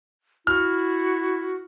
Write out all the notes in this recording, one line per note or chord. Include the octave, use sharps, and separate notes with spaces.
E4 F#4 F6